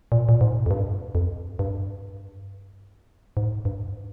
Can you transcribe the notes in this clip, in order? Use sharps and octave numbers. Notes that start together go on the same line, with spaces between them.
A#2
A#2
G#2
F2
G2
F2
G2
G#2
G2